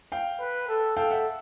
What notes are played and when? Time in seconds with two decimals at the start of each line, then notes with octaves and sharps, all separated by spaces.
0.12 F5 G5
0.40 B4
0.69 A4
0.97 A4 F5 G5
1.10 E5 F#5